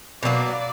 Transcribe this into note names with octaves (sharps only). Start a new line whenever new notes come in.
B2 F#3 A#3 D5